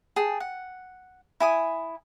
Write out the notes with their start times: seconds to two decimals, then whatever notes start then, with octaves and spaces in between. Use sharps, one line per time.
0.16 G#4 G5 A5
0.40 F#5
1.40 E4 G#5 D#6